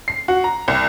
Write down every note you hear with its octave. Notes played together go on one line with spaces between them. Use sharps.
C7
F#4
A#5
C2